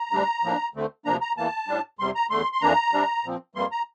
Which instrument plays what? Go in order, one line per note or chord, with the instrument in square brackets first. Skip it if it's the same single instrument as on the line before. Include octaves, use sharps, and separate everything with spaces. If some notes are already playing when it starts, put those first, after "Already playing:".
Already playing: [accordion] A#5
D2 C3 G3 D4
A2 F3 A#3 D4
D2 D3 A3 C4
D2 C3 F3 A#3 D4 A#5
A#5
E2 E3 A#3 A5
A2 G3 D4
E2 C3 G3 C6
A#5
E2 D3 A3 C6
C6
F2 E3 A#3 D4 A#5
C3 G3 D4
A#2 F3 C4
F2 E3 G3 A#3 C6
A#5